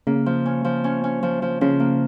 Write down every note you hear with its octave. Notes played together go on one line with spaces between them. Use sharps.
C#3 A#3
F3
C#4
F3
C#4
C#4
F3
F3
C#3 F3
A#3